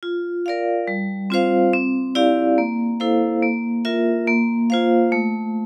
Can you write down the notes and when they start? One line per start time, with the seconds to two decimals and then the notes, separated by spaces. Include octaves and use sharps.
0.03 F4
0.46 A#4 D5 F5
0.87 G3
1.30 C4 F4 C5 F5
1.73 C4
2.15 E4 G4 D5 F5
2.58 A#3
3.00 E4 A4 C5 F5
3.43 A#3
3.85 F4 A#4 E5
4.27 A#3
4.70 F4 C5 F5
5.12 A3